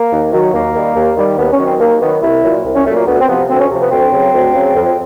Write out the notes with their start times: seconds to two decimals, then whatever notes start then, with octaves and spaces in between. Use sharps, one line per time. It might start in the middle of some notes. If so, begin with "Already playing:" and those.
Already playing: A#3
0.12 D#2
0.32 D#3 F#3
0.54 D#2 A#3
0.75 D#3 G3
0.96 D#2
1.17 D#3 G3
1.38 D#2 B3
1.52 C#4
1.59 D#3 F#3
1.66 C4
1.80 D#2 A#3
2.01 D#3 F#3 B3
2.22 C2 E4
2.44 A#2 F#3
2.65 C2
2.75 C#4
2.86 A#2 F#3 A3
2.96 A#3
3.07 D2 B3
3.20 C4
3.28 C3 F3 B3
3.49 D2 C4
3.60 C#4
3.71 C3 F3
3.81 B3
3.91 D2 C4
4.13 C#3 F#3
4.33 D2
4.55 C#3 F#3
4.75 F2